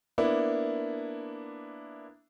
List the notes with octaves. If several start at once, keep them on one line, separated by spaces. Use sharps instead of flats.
A#3 B3 D4 E4